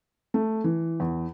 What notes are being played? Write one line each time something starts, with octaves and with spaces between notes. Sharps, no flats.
A3
E3
E2